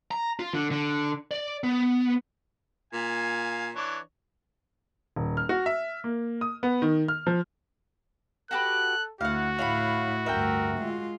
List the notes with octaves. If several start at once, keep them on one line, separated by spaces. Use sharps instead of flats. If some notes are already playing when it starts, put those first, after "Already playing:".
A#5
F4
D3
D3
D5
B3
A#2 F5 G#5
E3 D4 C#5
D#1
F6
F#4
E5
A#3
D#6
B3
D#3
F6
F3
F#4 G4 A4 B4 F#6
D2 E4 F#4 F5 F#5
A2 E4 C#5 F5 F#5 B5
D2 G2 A#4 E5 G5
G#3 F4